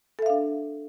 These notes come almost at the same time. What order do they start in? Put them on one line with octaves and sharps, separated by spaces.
A4 E5 F5 D4